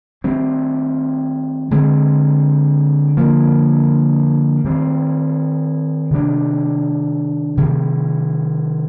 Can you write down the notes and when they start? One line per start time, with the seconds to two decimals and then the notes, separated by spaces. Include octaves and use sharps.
0.24 D#3 G3 C4
1.71 D3 G#3 C4
3.17 D3 F3 A#3
4.64 D#3 G3 C4
6.11 C3 D#3 G3 D4
7.57 C3 D#3 G3